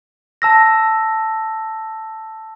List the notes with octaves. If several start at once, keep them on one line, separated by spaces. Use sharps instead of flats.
A5 E6 A#6